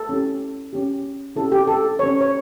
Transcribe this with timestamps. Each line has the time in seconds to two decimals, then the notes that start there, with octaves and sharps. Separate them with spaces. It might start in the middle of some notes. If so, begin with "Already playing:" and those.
Already playing: A4
0.09 C#4 E4 G4
0.73 C#4 G4
1.36 C#4 E4 G4 A4
1.52 G4
1.68 A4
1.99 C#4 G4 C#5
2.21 C#5